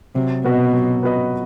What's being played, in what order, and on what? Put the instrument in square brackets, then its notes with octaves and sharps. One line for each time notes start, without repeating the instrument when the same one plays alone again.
[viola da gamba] C3 [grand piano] F#3
[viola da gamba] B2 [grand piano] B3 F#4 B4 D#5
[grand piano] F#3
B3 F#4 B4 D#5